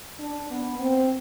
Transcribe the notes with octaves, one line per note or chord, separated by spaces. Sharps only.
D4
B3
C4